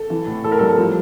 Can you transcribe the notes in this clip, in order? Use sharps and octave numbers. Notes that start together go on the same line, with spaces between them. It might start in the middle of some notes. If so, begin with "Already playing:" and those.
Already playing: A4
E3
A2
A2 A4
A#4
G3 A4
F3